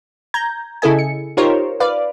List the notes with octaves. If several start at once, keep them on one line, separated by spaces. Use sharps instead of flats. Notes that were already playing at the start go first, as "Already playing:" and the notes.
A#5 G6 G#6
C#3 E4 G#4 A4 D#5 G#5
C#7
D#4 F4 G4 A#4 C5 C#5
B4 D5 F5